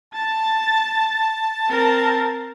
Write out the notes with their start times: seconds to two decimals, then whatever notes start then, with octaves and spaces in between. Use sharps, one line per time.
0.14 A5 A6
1.69 C4 A#4